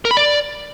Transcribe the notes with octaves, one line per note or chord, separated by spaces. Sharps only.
A#4
B5
D5